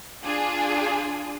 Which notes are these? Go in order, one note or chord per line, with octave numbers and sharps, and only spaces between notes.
D4 F4 G#4